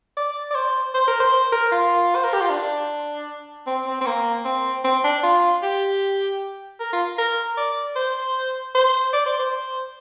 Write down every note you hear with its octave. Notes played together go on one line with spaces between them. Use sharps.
D5
D5
C5
C5
A#4
C5
C5
A#4
F4
C5
A#4
G4
F4
D4
C4
C4
C4
A#3
C4
C4
D4
F4
G4
A#4
F4
A#4
D5
C5
C5
D5
C5
C5